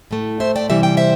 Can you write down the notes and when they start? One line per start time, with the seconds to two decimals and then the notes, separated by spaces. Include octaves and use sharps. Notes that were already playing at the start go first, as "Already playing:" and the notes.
0.11 A2 A3
0.40 C5 E5
0.56 D5 G5
0.70 C3 E3 G3 E5
0.83 G5
0.97 C5 E5